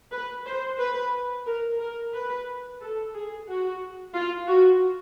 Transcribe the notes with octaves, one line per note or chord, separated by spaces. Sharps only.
B4
C5
B4
A#4
A#4
B4
A4
G#4
F#4
F4
F#4